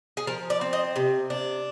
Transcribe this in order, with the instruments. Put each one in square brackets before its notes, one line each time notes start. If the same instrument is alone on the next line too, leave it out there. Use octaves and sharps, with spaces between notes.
[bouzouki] G#4
F3 A#4
D5
C4
D#5
C3
D4